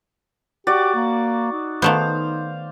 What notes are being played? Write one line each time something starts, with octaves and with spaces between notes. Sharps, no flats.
F#4 G4 D5
A#3
D#4
D#3 A3 B3 C5 F5